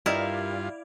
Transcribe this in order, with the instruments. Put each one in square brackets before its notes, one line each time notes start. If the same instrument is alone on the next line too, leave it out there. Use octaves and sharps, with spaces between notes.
[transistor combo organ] G2 F4 [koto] E4 [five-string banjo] G4 A#4 D#5 [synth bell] D5 F5